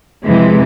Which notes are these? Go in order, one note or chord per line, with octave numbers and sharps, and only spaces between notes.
F2 C3 E3 G#3